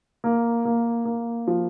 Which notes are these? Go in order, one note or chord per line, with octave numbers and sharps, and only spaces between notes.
A#3
A#3
A#3
F3